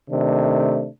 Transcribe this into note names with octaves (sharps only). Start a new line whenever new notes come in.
C3 D#3 A3 D4